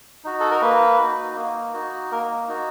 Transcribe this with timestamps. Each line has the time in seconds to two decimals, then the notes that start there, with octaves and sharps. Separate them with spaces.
0.25 D#4 F#4
0.40 A4
0.51 A#4
0.61 A#3 B4
0.98 D#4 F#4
1.36 A#3
1.74 D#4 F#4
2.11 A#3 A#4
2.48 D#4 F#4